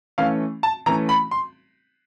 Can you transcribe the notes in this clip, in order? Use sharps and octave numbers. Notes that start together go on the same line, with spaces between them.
E3 A3 C#4 F5
A5
E3 A3 C#4 A#5
B5
C6